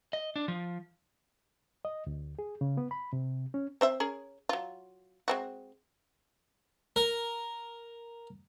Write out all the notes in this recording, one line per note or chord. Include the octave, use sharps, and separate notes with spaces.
D#5
D4
F3
D#5
D2
G#4
C#3
B3
B5
C3
C#4
C4 C5 E5
C#4 G#4 A#4
F#3 F4
G#3 C4 F#4
A#4